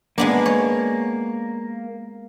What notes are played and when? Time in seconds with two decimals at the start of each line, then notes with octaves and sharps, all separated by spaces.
0.18 G#3 A#3 B3 D4
0.46 C#5